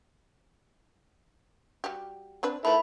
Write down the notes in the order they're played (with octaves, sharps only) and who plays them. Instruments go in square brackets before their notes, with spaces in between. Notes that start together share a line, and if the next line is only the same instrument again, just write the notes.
[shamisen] G3 F#4 G4
C4 D4 B4
[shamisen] D#3 F3 B4 [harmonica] E4 A4 [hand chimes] B5